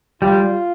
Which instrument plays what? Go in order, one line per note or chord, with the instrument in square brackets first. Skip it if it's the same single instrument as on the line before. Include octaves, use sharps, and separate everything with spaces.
[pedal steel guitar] G3 [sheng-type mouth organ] F4